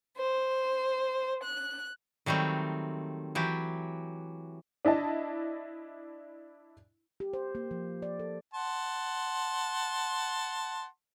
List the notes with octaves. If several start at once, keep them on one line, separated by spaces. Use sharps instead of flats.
C5
F#6
D#3 F#3 G3 A3 C4
E3 F#3 G4
D4 E4 D#5 A5
G4
C5
A#3
F3
D5
A4
F#5 A5 C6